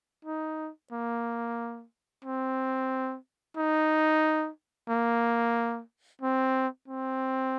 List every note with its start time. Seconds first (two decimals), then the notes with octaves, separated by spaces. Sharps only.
0.25 D#4
0.92 A#3
2.25 C4
3.57 D#4
4.89 A#3
6.21 C4
6.88 C4